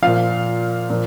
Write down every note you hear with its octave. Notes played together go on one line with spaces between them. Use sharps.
A#2 F3 F5
A#2 F3